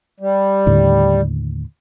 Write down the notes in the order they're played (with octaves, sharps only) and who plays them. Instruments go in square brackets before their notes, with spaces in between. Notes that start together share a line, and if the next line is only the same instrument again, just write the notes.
[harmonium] G3
[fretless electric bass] D#2 A2 D3